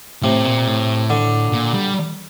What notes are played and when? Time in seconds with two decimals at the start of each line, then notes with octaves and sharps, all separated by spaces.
0.23 A2 C3
0.45 A#2
0.67 A2
1.10 D3
1.52 A#2
1.74 G3